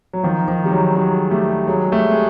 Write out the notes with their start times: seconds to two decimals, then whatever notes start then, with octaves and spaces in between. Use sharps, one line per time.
0.13 F#3
0.23 D#3 F3
0.48 D#3 F3
0.65 G3
0.72 F#3 G#3
0.95 F#3 G#3
1.31 G3 A3
1.68 F#3 G#3
1.84 G#3
1.92 G3 A3
2.11 G#3